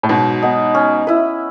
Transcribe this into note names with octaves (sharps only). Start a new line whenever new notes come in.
A2
G#2 B2 F#3
B3 D#4
C#4
E4 B4